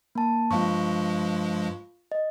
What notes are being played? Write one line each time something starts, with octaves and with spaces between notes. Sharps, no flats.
A#3 A5
G2 F3 G#3 F4 F5 C#6
D#5